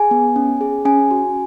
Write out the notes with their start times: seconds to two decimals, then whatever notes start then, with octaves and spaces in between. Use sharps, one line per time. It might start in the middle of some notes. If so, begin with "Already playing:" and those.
Already playing: G#4 G#5
0.11 B3
0.36 C#4
0.61 G#4
0.85 C#4 G#5
1.11 F#4